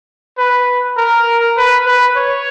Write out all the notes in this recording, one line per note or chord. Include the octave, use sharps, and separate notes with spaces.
B4
A#4
B4
B4
C#5